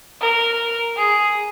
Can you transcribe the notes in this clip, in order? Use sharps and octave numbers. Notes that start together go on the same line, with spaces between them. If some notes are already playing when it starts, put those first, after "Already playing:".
A#4
G#4